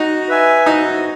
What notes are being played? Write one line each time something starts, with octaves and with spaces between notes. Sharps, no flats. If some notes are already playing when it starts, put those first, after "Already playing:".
Already playing: D#4 F#4
B4 E5 G#5
D#4 F#4